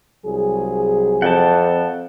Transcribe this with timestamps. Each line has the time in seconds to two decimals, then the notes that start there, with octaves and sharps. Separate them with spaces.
0.23 C2 F#3 G#4
1.22 F2 F#5 G5 A5